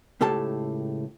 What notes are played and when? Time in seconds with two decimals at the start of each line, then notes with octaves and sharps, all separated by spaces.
0.21 C#2 A2 G4 A4 A5